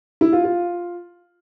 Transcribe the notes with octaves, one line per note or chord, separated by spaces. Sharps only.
E4
F4
F4